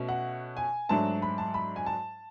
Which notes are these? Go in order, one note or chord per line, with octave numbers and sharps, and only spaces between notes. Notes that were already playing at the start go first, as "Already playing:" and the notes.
Already playing: B2 A3 C#4
F#5
G#5
G#2 F#3 A3 D4 A5
B5
A5
B5
G#5
A5